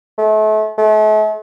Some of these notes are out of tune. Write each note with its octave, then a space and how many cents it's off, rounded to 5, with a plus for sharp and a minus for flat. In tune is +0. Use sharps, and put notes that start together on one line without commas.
A3 -35
A3 -45